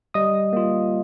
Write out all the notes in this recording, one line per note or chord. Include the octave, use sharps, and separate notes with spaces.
G3 D#5 D#6
A#3 F4